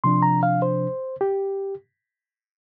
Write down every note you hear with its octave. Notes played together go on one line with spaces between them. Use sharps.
C3 F3 D4 C6
A#5
F5
C5
G4